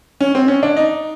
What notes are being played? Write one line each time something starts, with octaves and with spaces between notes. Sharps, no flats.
C#4
C4
C#4
D4
D#4